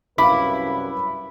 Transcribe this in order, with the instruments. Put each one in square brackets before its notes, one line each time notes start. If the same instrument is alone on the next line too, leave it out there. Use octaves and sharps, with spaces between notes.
[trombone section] C2 F#2 B4 [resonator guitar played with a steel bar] E4 [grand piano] F5 D6 [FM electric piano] B5